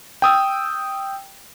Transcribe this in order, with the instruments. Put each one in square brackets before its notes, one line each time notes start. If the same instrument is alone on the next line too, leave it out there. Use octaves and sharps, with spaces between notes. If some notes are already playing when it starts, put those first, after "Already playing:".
[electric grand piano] G5 D#6 E6